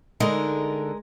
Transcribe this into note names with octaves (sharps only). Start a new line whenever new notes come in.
D3 G#3 D#4 A#4